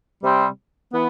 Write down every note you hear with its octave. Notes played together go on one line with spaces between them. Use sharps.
C3 G3 C4
E3 B3